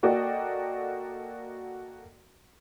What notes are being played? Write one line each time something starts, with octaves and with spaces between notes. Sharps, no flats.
A#3 F#4 A4 D5 D#5 G5